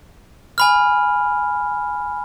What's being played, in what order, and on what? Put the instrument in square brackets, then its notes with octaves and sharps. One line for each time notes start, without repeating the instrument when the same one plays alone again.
[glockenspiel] G#5 B5 F6